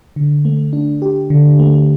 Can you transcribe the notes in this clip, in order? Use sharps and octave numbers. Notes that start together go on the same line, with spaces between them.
D3
A3
D4
G4
D3
A3